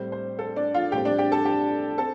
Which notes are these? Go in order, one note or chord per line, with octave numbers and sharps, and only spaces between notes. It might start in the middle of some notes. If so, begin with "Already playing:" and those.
Already playing: A2 G3 C4 C5
C5
A4
D4 D5
F4 F5
A2 G3 C4 G4 G5
D4 D5
G4 G5
A4 A5
G4 G5
C4 A4 A5